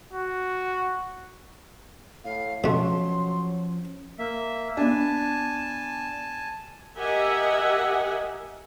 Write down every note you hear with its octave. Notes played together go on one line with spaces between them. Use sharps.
F#4
A2 F5
B2 F3 F#3 A3 C#4 C6
A#3 E5
B3 D4 G#5 A5
G4 A#4 D#5 E5 F#5 G#5